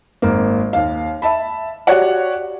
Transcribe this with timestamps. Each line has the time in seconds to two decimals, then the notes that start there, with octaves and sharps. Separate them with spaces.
0.22 G#1 A#3
0.73 D#2 F5
1.22 E5 A5 B5
1.87 F#4 G4 C#5 D5 F#5